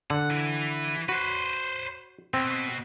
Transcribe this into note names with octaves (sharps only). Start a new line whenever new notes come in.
D3 F#5
E3 E4
F#4 B4 C5
B2 C4